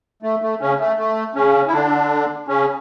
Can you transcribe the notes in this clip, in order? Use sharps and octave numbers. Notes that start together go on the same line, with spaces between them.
A3
A3
C#3 C#4
A3
A3
C#3 C#4
E4
D3 D4
C#3 C#4